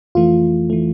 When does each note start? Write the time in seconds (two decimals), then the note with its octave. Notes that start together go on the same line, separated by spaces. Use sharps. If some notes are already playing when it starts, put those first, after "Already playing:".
0.15 F2 E3 A3 F4
0.70 E3 A3